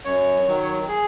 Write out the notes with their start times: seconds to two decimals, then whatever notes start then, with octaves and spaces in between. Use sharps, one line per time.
0.05 F#2 C#5
0.47 D#3 F#3
0.88 G#4